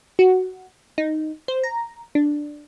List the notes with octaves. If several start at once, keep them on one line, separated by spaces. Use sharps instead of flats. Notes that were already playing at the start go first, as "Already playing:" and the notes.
F#4
D#4
C5
A#5
D4